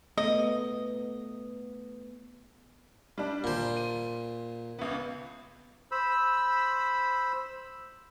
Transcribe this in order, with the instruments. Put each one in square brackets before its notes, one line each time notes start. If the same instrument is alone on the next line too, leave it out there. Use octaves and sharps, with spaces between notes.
[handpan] A3 B3 [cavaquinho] D#5
[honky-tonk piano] G3 D4
[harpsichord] A#2 C5
[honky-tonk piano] D#7
C#2 B3
[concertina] C5 B5 E6